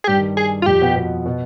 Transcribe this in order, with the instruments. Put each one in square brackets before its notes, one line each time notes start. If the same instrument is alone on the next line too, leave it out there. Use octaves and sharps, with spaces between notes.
[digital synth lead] G#4
[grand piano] G2 G3 [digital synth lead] G4
[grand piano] D#3
[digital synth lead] G#4
F4
[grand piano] F2 F3 [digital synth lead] G4
[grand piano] B2 B3
B2 B3
B2 B3